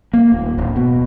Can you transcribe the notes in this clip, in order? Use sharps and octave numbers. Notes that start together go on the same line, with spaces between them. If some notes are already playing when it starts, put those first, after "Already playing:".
A#3
D#1
D1
B2